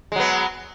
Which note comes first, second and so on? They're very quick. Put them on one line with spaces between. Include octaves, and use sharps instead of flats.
G#3 F#3 B3